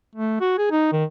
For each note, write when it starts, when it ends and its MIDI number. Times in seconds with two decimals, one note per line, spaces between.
0.15 0.37 57
0.40 0.57 66
0.58 0.68 68
0.71 0.91 63
0.92 1.04 51